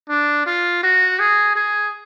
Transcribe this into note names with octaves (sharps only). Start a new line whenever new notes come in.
D4
F4
F#4
G#4
G#4